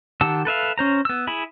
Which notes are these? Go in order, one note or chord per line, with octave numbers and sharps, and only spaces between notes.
D#3 G4 F#5 A5 E6
A4 B4 E5 F5
C#4 C5 A#5
B3 E6
E4 G#4 B5